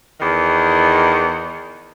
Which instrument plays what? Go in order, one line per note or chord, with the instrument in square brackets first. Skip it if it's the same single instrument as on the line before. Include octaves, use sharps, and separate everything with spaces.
[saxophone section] E2 D#3